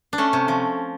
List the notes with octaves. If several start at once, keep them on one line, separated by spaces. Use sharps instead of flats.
D4
A3 C#4
C3
F3